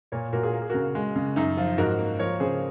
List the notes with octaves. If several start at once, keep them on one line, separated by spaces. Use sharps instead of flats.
A#2 A#4 C#5
A#2 F#4 A#4
F4 G#4
A#3 A#4
G#4
C#3 F#4 A#4
G#3
C#3
F#2 D#4
F3 F4
G#2 F#4 A#4
A#3
F3 A#4 C#5
C#3 G#4 C5